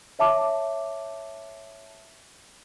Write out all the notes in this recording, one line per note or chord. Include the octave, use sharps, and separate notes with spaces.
C#5 E5 A5 D6